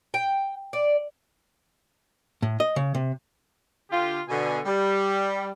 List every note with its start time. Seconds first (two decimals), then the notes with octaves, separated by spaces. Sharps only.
0.14 G5
0.73 D5
2.42 A2
2.60 D#5
2.76 C#3
2.95 C3
3.90 D3 F4 G4
4.29 B2 D3 G#5
4.66 G3